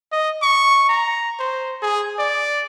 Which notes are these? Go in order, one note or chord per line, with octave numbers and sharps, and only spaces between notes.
D#5
C#6
A#5
C5
G#4
D5